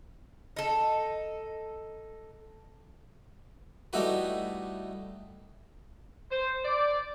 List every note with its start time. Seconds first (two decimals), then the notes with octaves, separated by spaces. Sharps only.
0.57 D#4 A4
3.93 G3 A3 D#4 E4 F#4 B4
6.31 C5
6.64 D5